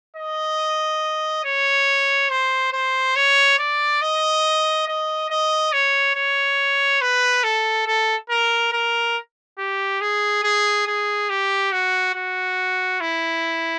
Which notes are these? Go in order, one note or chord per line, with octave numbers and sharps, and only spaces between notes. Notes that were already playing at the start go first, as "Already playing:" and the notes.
D#5
C#5
C5
C5
C#5
D5
D#5
D#5
D#5
C#5
C#5
B4
A4
A4
A#4
A#4
G4
G#4
G#4
G#4
G4
F#4
F#4
E4